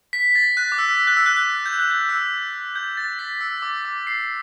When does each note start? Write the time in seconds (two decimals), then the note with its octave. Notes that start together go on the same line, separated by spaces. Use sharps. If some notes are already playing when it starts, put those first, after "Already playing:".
0.13 B6
0.35 A6
0.57 F#6
0.72 D6
0.78 E6
1.07 F#6
1.17 E6
1.26 F#6
1.36 F#6
1.66 G6
1.79 F#6
1.91 G6
2.09 E6
2.75 G6
2.97 A6
3.19 B6
3.41 E6
3.62 D6
3.85 D6
4.07 C7